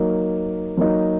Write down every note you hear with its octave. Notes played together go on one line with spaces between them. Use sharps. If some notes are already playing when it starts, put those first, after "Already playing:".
Already playing: F#3 A#3 D#4
F#3 A#3 D#4